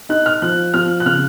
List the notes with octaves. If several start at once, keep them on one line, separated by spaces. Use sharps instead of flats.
D#4 F#6
F6
F3 F#6
F3 F6
F#6
C#3 F6